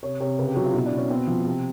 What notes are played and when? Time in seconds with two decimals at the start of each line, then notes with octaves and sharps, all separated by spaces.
0.03 C3 C#5
0.20 C3 C#5
0.39 C#3 B4
0.47 G4
0.56 F#3 F#4
0.65 F4
0.74 B2 E4
0.86 D4
0.92 B2
0.98 C#4
1.10 B3 C4
1.27 F3
1.46 C3